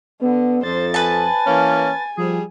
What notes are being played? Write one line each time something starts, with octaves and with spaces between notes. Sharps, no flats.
D3 B3
F2 C5 A6
B4 G#5 A5
E3 A#3 C#4
F3 G3 G#4